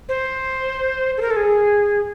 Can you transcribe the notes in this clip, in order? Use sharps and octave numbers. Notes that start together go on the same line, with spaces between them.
C5
A4
A#4
A4
G#4